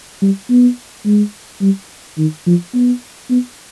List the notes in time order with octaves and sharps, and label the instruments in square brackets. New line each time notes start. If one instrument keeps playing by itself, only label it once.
[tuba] G3
B3
G#3
G3
D#3
F3
B3
B3